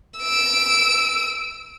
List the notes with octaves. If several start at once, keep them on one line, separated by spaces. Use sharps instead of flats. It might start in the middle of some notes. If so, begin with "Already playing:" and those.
E6 D7